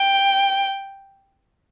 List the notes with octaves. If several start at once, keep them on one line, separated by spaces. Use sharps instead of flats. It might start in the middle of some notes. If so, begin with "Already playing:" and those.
Already playing: G5